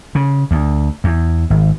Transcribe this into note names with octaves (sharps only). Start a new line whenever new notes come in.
C#3
D2
E2
G#1